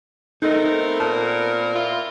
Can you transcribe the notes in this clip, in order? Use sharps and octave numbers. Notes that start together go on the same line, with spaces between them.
A3 B3 C4 D#4 A#4 D#5
A#2 A5
A#3 E4 F4